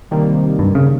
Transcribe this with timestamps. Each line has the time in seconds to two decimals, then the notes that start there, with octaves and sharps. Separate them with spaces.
0.11 C3 D#3 G3 A#3
0.59 G2
0.75 C#3